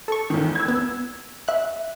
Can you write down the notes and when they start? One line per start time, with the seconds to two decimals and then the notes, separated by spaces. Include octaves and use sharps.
0.08 A4 C#6
0.30 E2 D#3
0.55 E6 G#6
0.68 B3
1.48 E5 F#6